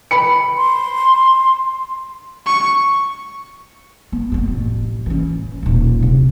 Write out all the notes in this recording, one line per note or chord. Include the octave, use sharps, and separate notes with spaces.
B5 C#7
C6
C#6
B3
B3 C4
A1
E3 C#4
D#1 B1
C3